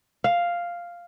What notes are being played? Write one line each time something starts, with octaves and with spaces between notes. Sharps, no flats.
F5